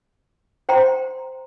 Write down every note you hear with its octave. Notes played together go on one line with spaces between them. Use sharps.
C5 G5 A#5 C6